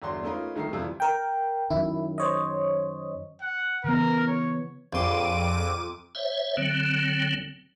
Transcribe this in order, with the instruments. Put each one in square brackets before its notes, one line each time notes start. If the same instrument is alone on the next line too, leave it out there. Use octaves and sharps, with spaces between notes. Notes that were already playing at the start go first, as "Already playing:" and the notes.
[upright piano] G1 E2 D4 F#4 C6
A3 A#3 C#4 D#4 F4 B4
C2 D#3 A3 A#4 C7
F2 C3 E3 G3 F4
[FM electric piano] A#4 G5
[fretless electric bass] F#2 D#3 [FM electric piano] E4
[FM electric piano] C5 C#5 D#5
[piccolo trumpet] F#5
[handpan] C#3 E3 B3 [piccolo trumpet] A#4
[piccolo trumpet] C#5
[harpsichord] A#1 C6 [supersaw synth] F2 D6 D#7
[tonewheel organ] C5 C#5 E5
D3 F#3 C4